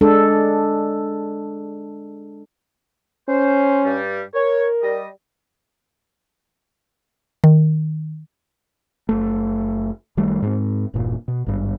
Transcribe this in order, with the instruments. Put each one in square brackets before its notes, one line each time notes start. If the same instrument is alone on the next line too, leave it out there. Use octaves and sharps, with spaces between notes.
[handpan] G#3 D4 A4
[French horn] C#4 [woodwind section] C5
[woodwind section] G2 G3
[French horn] A#4 [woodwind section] C#5
[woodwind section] G3 D#5
[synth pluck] D#3
[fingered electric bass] F#1 A3
F#1 D#3 G3 A3
G#2 C4
E1 G2 A#2
B2
G#1 G2